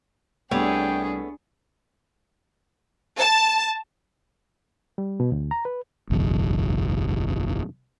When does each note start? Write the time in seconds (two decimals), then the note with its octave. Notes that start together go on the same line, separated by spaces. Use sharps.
0.51 C2 A3 B3 D4 G4 G#4 C#5 G5
3.19 A5
4.98 G3
5.20 B2
5.32 D2
5.51 A#5
5.65 B4
6.10 F#1 B1 E2